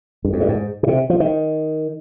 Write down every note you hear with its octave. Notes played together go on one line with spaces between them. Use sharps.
G2
F2
G2
G#2
B2
C3
F3
D#3